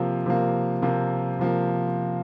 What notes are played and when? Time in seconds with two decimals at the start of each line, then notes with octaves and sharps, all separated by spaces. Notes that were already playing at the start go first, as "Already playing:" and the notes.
Already playing: C3 F3 A#3
0.26 C3 F3 A#3
0.82 C3 F3 A#3
1.39 C3 F3 A#3